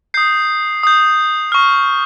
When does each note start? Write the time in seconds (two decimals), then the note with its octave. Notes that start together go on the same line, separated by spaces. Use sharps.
0.14 D#6 G6 C7
0.83 D#6 G6
1.52 C#6 F6